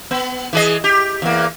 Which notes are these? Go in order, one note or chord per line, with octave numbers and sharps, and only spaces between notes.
B3
E3 G#4 D#5
G4
E2 A#3